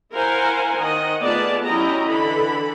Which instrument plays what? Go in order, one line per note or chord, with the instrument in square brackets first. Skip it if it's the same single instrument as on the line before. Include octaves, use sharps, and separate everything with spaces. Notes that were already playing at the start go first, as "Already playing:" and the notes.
[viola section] E4 A#4 C5 F5 F#5 G#5
D#3 D#5 F#5
A3 B3 F4 G#4 D5 A5
F#3 C#4 E4 G4 D#5 A#5
D3 E3 A4 B5